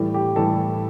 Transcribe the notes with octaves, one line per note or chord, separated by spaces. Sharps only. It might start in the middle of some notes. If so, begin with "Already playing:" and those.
Already playing: A2 E3 G3
G4
A2 E3 G3 A4